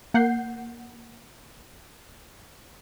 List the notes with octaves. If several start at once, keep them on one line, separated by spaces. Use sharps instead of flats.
A#3 F#5 G6 C7